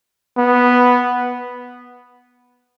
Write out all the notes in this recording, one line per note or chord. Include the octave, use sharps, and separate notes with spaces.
B3